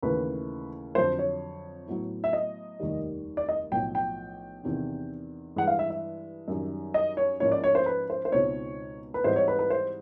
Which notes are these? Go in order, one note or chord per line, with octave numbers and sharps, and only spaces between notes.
D#2 C#3 E3 A3 B4
F2 D3 F#3 C5
C#5
A2 F#3 B3 E4
E5
D#5
F1 D#2 D#3 G3
D5
D#5
B1 A2 F3 G5
G5
E2 C3 D#3
G2 E3 G#3 F#5
F5
E5
E5
F#2 D#3 G3
D#5
C#5
G#2 F3 A#3 C#4 E4 C#5
D5
C#5
C5
B4
C5
C5
C#2 B2 G#3 C4 D#4 C#5
B4
G#2 E3 G3 C4 C5
C#5
B4
B4
C5